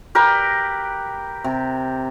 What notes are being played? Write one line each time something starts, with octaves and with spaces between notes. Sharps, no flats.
G4 A#4 B4 C6
C3